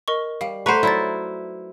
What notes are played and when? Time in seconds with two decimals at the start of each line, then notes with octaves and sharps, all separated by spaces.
0.08 A#4 D#5 C#6
0.41 G3 F5
0.66 A3 B4 C5 F#5 A#5 C#6
0.83 F#3 D#4 E4 D5 A6